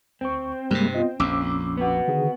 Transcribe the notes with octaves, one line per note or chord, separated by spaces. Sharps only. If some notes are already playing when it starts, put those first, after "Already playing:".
D2 C4 C#6
G2 C3 G3 G#3 A#3
B3 F4 D#5
A#1 F2 C#4 D6 E6
B3 F#4
D3 D#3 G#4